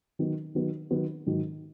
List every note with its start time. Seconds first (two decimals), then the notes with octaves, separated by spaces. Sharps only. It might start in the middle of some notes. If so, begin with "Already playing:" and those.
0.19 D#3 F#3 B3
0.55 D#3 F#3 B3
0.91 D#3 F#3 B3
1.26 G#2 D#3 F#3